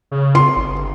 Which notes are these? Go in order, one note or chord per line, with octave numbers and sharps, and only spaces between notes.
C#3
C6
G1